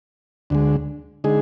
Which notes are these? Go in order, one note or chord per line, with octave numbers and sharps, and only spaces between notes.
D2 D3 G#3
D3 G#3 D#4 G#4